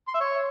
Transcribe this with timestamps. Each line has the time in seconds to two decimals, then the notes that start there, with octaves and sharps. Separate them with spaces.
0.08 C6
0.14 E5
0.20 C#5